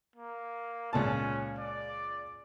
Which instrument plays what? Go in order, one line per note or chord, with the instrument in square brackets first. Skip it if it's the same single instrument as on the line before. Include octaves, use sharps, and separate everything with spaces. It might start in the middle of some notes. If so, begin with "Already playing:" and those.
[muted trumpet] A#3
[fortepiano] C#2 A#2 A5 [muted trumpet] C#4
[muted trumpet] D5